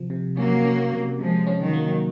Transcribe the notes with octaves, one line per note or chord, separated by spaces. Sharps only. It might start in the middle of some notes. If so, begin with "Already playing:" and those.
Already playing: C3 F3
C3
F#3 A#3 C#4
C#4
C3
C3 F3 G#3
C#4
D#3 F#3
A#3